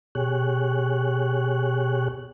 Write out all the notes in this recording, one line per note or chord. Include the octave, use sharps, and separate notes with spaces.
B2 G4 G#4 C#5 F#6